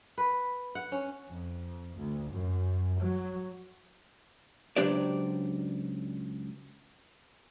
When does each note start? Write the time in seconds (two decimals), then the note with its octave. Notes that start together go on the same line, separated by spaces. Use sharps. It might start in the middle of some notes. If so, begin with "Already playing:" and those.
0.18 B4
0.75 F#5
0.92 C#4
1.29 F2
1.96 D2
2.30 F#2
3.00 F#3
4.76 C#2 F#3 D4 G4 C5 D5